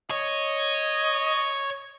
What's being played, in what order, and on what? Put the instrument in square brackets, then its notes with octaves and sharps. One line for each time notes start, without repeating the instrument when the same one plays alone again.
[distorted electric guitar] C#5 [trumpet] D#5